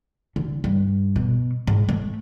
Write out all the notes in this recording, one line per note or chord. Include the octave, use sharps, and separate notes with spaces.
D3
G2
B2
G#2
A3